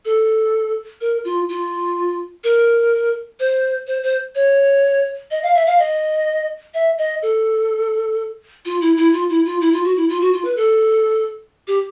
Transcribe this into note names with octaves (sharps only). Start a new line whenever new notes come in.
A4
A#4
F4
F4
A#4
C5
C5
C5
C#5
D#5
F5
E5
F5
D#5
E5
D#5
A4
F4
E4
E4
F4
E4
F4
E4
F4
F#4
E4
F4
F#4
F4
B4
A4
G4